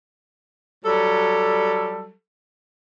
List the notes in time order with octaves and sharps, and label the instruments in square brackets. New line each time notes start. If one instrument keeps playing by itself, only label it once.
[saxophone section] F#3 G3 A4